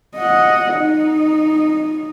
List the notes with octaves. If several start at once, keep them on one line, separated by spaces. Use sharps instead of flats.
D#5 F#5
D#4